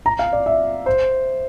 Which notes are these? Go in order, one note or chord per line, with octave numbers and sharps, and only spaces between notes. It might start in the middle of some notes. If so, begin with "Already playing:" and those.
A#5
F5
D5
E5
C5